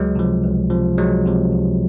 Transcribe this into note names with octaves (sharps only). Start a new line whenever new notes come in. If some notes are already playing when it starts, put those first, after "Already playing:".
Already playing: C#2 F#3 G#3
C3 F3
C#2
C3 F3
C#2 F#3 G#3
C3 F3
C#2